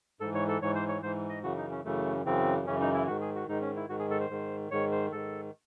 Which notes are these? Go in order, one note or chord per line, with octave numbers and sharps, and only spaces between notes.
G#2 E3 A4
C#5
A4
G#2 E3 C#5
C5
C#5
G#2 E3 C5
D#5
F#2 C#3 E3 F#4
D#4
C#4
F#2 C#3 E3 A3
F#2 C#3 E3 C4
F#2 C#3 E3 C#4
D#4
E4
G#2 D#3 F#4
G#4
F#4
G#2 D#3 D#4
C#4
E4
G#2 D#3 F#4
G#4
A4
C5
G#2 D#3
G#2 D#3 C#5
C5
G#2 D#3 A4